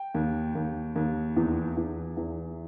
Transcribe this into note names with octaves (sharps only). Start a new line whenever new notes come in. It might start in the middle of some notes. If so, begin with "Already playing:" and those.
Already playing: G5
D#2
D#2
D#2
E2
E2
E2